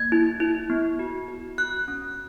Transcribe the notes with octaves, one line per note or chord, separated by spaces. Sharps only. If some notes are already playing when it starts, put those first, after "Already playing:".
Already playing: A#3 G#6
E4
E4
B3
F#4
F#4
F#4 F#6
C#4